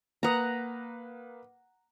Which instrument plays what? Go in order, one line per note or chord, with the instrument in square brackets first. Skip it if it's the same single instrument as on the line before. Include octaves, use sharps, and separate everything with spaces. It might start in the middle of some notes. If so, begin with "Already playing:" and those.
[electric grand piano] A#3 B4 D#6 [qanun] F#5 A#5